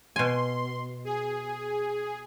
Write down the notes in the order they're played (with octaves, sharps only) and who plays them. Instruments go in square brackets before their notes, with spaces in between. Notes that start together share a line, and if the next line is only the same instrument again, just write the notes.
[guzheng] B2 G#5 [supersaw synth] C6
[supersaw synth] G#4